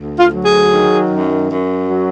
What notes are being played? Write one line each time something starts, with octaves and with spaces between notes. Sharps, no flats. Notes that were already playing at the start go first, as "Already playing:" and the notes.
Already playing: D2
F4
F#3
G#4
D#3
F#2
F#2
F#3